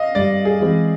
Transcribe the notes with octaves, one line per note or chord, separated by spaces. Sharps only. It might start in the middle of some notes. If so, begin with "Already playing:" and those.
Already playing: D#5 F5
G2 D5
G#4
E3 G#3 C4